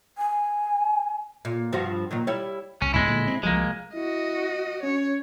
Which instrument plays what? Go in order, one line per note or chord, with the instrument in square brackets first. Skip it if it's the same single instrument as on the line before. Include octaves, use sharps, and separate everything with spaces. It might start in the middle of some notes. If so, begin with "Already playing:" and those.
[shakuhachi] G#5
[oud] A#2
G2 F3 F#4
A#2 D#3 F#3
G3 E4 C#5
[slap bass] C2 [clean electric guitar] C#4
[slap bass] C2 F#2 B3 [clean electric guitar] G#3 E4
[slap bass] A#2 D3 F#3
C4
[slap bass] C2 F3 F#3 [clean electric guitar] G#3 A#3
[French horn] E4 [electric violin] F#4 D#5
[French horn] C#4 [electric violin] C#5